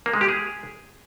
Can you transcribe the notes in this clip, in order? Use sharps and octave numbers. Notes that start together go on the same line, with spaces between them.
A#3
G#3
G4
G#4